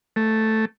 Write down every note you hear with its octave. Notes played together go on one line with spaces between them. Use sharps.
A3